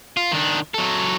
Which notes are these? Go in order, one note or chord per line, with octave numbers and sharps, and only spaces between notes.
F4
D#3 D4
F#3 A4